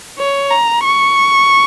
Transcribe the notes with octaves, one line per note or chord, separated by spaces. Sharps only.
C#5
A#5
C#6